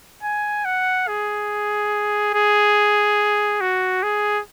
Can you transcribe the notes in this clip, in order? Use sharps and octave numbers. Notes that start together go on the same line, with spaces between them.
G#5
F#5
G#4
G#4
F#4
G#4